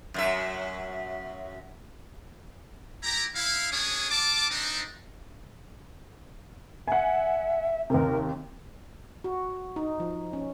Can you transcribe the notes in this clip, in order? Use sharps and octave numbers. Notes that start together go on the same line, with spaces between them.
F#2 F#3 E5
E4 G4 A#5
E4 F5
A#3 C#4 D4 G#4 C#5 D#6
F4 A5 D6
C4 D4 D#4
E5 F#5 G#5
D#2 C3 A#4
F#4
D#4
F3
C#4